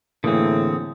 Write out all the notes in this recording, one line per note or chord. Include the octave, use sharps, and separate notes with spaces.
A2 D3 E3 A#3 C4 G#4 D#6